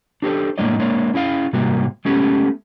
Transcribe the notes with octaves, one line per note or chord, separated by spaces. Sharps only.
D4 G4 A4 C5
A2 G#3 A#3 D4 C#5 D#5
G#3 A#3 D4 C#5
C#4 E4 G#4 F5
G#2 C3 G3 A#3 F#4
G#3 A3 B3 C#4 G4